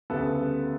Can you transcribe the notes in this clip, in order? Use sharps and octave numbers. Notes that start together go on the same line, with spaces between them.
D2 C#3 G3 B3 A4